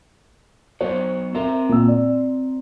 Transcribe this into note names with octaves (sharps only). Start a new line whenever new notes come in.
F#3 B3 F#4 C5
C4 A#4 C5 E5 A#5
A#2 E6
D5